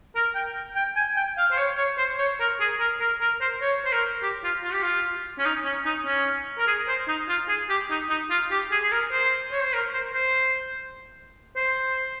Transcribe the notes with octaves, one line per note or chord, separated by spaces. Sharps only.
A#4
G5
G5
G#5
G5
F5
C5
C#5
C#5
C5
C#5
A#4
G#4
A#4
A#4
A#4
C5
C#5
C5
A#4
G4
F4
F4
G4
F4
C#4
D#4
C#4
D#4
C#4
A#4
G#4
C5
D#4
F4
G#4
G4
D#4
D#4
F4
G4
G#4
G#4
A#4
C5
C#5
C5
A#4
C5
C5
C5